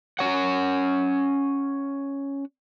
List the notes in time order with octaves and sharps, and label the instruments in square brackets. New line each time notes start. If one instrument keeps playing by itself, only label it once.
[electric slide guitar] C#4 C#5 F#5